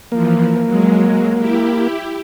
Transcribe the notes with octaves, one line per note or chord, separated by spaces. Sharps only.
E3 F3 A#3
F#3 G#3
E4 G4